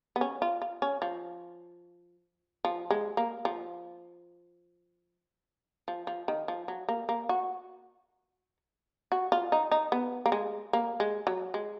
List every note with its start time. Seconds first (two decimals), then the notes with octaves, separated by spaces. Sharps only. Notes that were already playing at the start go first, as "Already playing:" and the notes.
0.16 B3
0.21 C#4
0.42 F4
0.62 F4
0.82 C#4
1.02 F3
2.65 F3
2.90 G#3
3.17 A#3
3.45 F3
5.88 F3
6.07 F3
6.28 D#3
6.48 F3
6.68 F#3
6.89 A#3
7.09 A#3
7.29 F#4
9.12 F#4
9.32 F4
9.52 D#4
9.71 D#4
9.92 B3
10.26 A#3
10.32 G#3
10.73 A#3
11.00 G#3
11.27 F#3
11.54 G#3